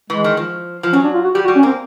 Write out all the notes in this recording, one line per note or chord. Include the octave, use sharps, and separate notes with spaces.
E3 G#3
D#3
F3
F3
F#3 C#4
D4
F4
F#4
G3 G4
F#4
G3
C#4
A#3 C4